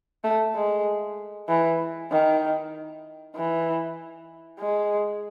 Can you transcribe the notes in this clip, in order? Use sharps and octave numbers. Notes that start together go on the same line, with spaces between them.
A3
G#3
E3
D#3
E3
G#3